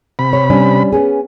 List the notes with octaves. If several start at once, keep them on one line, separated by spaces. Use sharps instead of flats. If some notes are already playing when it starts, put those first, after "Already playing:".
C3 B5
C#5
G3 C#4 D4
B3 C#4 G#4